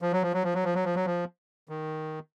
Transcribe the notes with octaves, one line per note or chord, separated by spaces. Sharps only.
F3
F#3
F3
F#3
F3
F#3
F3
F#3
F3
F#3
F3
D#3